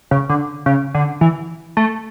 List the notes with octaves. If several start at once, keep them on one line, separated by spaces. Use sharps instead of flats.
C#3
D3
C#3
D3
E3
A3